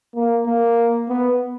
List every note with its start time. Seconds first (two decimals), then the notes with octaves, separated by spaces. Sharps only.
0.15 A#3
0.47 A#3
1.09 B3